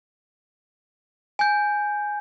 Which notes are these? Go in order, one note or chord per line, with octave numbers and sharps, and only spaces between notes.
G#5 G6